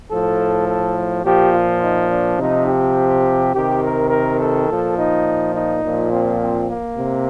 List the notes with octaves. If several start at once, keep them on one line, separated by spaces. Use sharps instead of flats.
A2 F3 A4
A4
A#2 F3 G4
F4
D#4
D4
C3 F3 D#4
G4
C3 D#3 G4
A#4
A#4
A4
A#2 F3
D#4
D#4
A#2 F3
C4
C4
A#3
C3